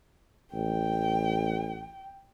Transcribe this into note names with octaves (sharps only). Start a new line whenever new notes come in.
A1 G5